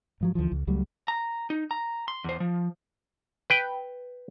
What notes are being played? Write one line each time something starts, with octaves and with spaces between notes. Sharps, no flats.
G#2 F3 F#3
D2 E3 F3
C#2
C#2 F#3 G3 A3
A#5
D#4
A#5
C6
E2 C5
F3
B4 G5